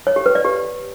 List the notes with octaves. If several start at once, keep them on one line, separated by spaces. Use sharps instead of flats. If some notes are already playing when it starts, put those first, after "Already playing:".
C#5
G4
B4
D5
G4